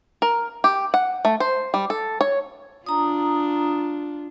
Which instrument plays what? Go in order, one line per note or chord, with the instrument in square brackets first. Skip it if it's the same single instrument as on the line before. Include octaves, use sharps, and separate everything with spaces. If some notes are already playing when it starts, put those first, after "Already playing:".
[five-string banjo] A#4
G4
F#5
A3
C5
G3
A4
C#5
[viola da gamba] D4 F4 [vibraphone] A#5 D#6